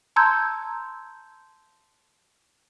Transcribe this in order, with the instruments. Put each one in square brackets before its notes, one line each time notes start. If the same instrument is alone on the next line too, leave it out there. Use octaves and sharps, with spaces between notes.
[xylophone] A5 A#5 C6 E6 G6 G#6